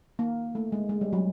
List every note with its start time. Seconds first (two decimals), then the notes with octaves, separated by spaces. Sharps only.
0.19 A#3
0.55 A3
0.72 G#3
0.89 G#3
1.01 G3
1.13 F#3